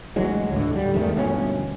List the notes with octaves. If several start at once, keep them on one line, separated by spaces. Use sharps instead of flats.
D2 E3 F#3 G#3
D2 A2 D3
G3
E2 G#2 D#3 A3
G1 B2 E3 C#4